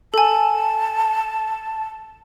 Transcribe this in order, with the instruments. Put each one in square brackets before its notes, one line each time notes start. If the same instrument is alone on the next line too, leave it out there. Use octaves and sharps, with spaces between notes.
[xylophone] A4 G#5 [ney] A5